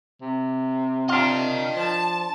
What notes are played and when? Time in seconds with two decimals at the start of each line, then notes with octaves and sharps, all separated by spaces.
0.21 C3
1.09 D4 F4 D#5 G5
1.76 F3 A5